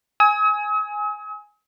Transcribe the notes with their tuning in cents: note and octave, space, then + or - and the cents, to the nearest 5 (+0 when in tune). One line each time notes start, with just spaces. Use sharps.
G#5 +0 D#6 +45